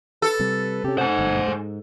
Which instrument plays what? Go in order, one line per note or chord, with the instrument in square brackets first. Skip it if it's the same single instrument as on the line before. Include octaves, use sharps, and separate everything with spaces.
[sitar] A4 [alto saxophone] B4
[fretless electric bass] C3 G3
[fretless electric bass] C3 C#4 [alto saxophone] G4
[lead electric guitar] C5 G#5 [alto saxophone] F#5
[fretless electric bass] G1
G#2